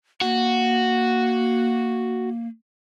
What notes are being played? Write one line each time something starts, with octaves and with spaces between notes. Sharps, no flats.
A#3 F#4